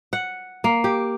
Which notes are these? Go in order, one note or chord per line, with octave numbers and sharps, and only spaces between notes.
F#5
A#3
G4